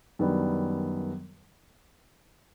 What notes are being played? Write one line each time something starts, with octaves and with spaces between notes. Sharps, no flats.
F#2 D#3 G3 B3 D4